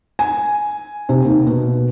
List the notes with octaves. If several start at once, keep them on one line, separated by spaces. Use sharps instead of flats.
G#5
C3
D#2
B2